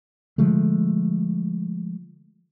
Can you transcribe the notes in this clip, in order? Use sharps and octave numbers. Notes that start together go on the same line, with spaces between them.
D3 F3 G#3 A3